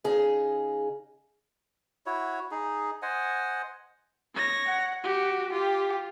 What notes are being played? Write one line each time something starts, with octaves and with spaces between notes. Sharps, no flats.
C#3 D#4 G#4
E4 F#4 C#5
D#4 G#4
C5 D#5 F#5 G#5
C#5 A#6
F#5
F#4 G4
F4 G4